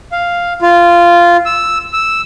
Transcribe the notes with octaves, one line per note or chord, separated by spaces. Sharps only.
F5
F4
E6
E6